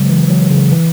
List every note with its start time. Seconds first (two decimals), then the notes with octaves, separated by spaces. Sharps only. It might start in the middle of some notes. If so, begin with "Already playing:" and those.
Already playing: C#3 F#3 G#3
0.09 E3
0.30 F#3
0.50 C#3
0.71 E3